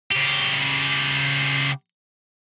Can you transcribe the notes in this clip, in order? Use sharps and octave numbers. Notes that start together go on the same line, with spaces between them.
C#3 G4